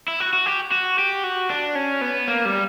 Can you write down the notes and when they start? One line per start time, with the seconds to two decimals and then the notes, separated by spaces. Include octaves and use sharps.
0.08 E4
0.20 F#4
0.33 F#4
0.46 G4
0.71 F#4
0.98 G4
1.24 F#4
1.50 D4
1.75 C#4
2.01 B3
2.28 A#3
2.45 G3